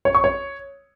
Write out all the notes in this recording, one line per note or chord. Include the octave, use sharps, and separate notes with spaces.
C#5
C#6
C#5